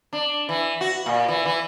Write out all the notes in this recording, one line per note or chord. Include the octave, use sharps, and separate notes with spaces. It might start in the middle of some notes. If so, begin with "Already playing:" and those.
D4
E3
F#4
A#2
E3
E3